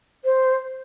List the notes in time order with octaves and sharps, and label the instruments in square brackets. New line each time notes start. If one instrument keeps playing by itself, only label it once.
[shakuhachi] C5